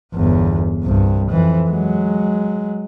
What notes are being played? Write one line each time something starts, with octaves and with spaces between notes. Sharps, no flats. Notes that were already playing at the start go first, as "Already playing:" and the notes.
G1 E2
C2 G2
F2 E3
F#3 G#3